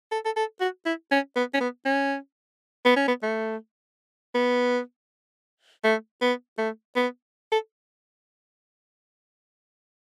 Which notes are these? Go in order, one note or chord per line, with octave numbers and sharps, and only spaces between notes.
A4
A4
A4
F#4
E4
C#4
B3
C#4
B3
C#4
B3
C#4
B3
A3
B3
A3
B3
A3
B3
A4